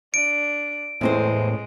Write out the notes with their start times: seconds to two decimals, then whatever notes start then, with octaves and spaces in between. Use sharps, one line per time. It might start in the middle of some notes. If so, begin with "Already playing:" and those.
0.14 D4 D7
1.01 E2 A2 G#3 C4 C5